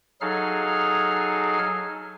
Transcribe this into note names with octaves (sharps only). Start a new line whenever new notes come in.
F#3 D#4 G#4 A4 F5 F6